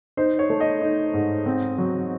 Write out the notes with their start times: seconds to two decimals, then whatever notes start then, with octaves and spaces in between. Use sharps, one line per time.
0.17 D#4 C5
0.39 C#5
0.50 A3
0.60 D#5
0.81 D#4
1.14 G#2
1.46 C4
1.78 F#3